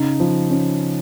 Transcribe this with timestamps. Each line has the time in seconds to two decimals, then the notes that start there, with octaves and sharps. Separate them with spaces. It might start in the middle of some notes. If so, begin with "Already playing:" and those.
Already playing: C#3 D#4
0.20 F3
0.50 C#4